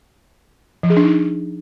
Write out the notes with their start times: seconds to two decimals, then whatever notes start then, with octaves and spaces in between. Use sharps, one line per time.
0.83 F3
0.90 G#4
0.97 D4
1.03 D#4